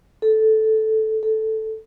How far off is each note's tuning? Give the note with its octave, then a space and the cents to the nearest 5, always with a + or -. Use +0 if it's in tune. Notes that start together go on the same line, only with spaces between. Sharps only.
A4 -10
A4 -5